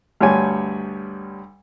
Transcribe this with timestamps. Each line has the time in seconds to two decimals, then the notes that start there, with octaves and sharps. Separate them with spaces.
0.20 D2 G2 G3 C#5 G#5